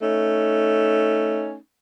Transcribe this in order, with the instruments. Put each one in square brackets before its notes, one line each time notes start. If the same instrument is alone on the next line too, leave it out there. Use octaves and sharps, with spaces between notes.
[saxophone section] A3 C#4 D#4